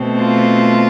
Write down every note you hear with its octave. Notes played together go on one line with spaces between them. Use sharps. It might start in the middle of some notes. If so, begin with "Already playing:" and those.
Already playing: B2 A3 C4
F4